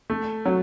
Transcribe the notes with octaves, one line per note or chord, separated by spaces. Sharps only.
A3
F#3